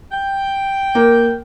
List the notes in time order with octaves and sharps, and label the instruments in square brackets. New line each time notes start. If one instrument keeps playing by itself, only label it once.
[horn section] G5
[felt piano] A#3